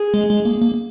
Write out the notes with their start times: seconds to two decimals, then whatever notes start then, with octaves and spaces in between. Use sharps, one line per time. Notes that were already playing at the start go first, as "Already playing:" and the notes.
Already playing: G#4
0.14 G#3
0.30 G#3
0.45 A#3
0.62 A#3